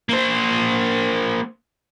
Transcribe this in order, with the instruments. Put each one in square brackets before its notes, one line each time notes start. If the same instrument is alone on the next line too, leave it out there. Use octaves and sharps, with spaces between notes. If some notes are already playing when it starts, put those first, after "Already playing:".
[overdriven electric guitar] A#3 C5